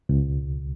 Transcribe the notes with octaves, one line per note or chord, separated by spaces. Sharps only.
C#2